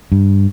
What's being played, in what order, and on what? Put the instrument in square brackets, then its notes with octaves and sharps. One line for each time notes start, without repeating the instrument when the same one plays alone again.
[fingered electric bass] G2